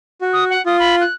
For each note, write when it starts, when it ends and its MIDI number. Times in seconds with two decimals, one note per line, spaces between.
0.21 0.54 66
0.33 0.44 87
0.50 0.64 78
0.66 1.02 65
0.66 0.77 87
0.79 0.96 83
1.01 1.14 90